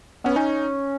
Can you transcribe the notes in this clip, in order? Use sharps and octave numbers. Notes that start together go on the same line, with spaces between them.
B3 C#4
C#4 D#4